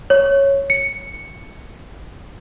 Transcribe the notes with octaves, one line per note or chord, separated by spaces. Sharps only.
C#5
C#7